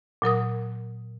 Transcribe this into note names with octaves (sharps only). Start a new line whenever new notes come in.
A#2 F#3 A#4 D#6